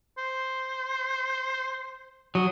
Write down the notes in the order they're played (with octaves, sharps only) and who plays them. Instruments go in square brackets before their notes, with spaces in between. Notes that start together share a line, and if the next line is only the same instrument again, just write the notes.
[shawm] C5
[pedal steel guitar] F#3 [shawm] D#6